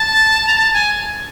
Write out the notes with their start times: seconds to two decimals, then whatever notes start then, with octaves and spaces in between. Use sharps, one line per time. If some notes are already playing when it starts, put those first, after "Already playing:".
Already playing: A5
0.47 A#5
0.54 A5
0.74 G#5